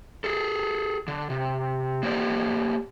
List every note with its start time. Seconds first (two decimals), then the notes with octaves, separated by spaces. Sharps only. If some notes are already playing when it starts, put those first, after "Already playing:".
0.24 G#4 A4
1.08 D3
1.30 C3
2.03 A#3 G4 C5 D5